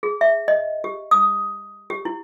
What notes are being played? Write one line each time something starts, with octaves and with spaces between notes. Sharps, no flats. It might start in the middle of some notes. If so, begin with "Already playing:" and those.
G#4
E5
D#5
G4
D#6
G4
E4